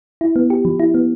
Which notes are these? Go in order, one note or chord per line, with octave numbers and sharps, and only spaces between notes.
E4
B3
G4
F3
E4
B3